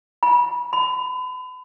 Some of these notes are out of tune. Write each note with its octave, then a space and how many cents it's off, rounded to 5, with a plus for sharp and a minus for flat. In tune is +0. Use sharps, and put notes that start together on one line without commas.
B5 -25
B5 +35